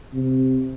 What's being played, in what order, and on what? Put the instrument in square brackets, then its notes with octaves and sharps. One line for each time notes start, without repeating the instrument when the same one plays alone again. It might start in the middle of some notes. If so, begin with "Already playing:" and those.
[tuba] C3